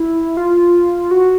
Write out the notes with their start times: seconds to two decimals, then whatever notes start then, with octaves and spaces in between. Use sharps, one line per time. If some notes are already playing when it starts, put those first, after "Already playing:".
Already playing: E4
0.37 F4
1.11 F#4